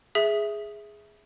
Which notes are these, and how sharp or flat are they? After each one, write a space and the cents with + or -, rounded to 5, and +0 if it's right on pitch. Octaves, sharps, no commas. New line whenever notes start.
G#4 +0 E5 +0